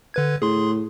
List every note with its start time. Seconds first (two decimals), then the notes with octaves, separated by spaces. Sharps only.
0.14 D3 B4 G#6
0.42 A2 G#4 C6